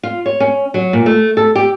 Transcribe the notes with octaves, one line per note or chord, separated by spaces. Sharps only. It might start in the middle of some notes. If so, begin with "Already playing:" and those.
F4
C#5
C#4
F#3
A#2
A3
A4
G4